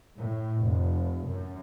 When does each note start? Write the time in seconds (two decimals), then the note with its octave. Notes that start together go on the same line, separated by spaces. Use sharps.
0.16 A2
0.65 F1
1.29 F#2